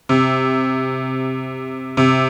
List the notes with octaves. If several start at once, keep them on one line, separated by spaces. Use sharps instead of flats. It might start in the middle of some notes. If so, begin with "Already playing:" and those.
C3
C3